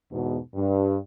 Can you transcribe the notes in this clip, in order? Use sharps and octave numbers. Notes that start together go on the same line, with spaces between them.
E2 G#2 B2
G2